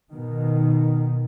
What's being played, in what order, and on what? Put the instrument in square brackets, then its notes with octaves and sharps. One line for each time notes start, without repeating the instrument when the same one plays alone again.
[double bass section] B2 D#3